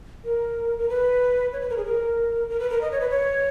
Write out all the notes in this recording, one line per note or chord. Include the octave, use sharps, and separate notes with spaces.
A#4
A#4
B4
C#5
B4
A#4
G#4
A#4
A#4
B4
A#4
D#5
C#5
B4
C#5